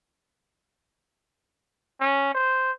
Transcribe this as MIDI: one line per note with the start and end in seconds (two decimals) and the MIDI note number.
2.01 2.34 61
2.35 2.72 72